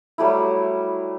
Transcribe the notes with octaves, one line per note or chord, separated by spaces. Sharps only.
F#3 G3 A3 E4